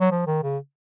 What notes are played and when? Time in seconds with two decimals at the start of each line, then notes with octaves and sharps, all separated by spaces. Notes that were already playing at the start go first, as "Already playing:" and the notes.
0.01 F#3
0.11 F3
0.27 D#3
0.43 C#3